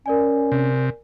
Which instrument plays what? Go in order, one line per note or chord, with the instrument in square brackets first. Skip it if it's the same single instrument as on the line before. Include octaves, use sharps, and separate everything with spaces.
[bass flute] C#4 [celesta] A#4 D5 G#5
[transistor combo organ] C3